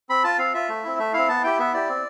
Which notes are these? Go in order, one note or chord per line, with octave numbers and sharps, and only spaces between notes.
C4 B5
F4 A5
C4 F5
F4 E5
A3
C4 E4
A3 E5
C4 E4 F5
B3 A5
E4 G4 G5
B3 E5
E4 G4 D5
C4